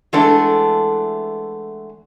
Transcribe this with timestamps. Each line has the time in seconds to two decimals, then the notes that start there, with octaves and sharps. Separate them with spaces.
0.13 E3 G#3 A3 B3 D4 A4